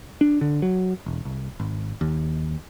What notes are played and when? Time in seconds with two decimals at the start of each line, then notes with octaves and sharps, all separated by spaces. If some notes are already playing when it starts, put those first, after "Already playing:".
0.21 D4
0.41 D3
0.62 F#3
1.06 E1
1.25 C2
1.60 G#1
2.01 D#2